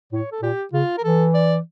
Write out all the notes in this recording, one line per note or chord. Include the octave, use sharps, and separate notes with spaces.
A2 C#5
A4
A#2 G4
C#3 F4
A#4
E3 A4
D5